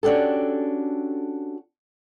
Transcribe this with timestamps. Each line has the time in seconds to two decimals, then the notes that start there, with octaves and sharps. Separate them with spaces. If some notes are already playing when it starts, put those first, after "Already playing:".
0.03 C#4 D4 F#4 G4 A4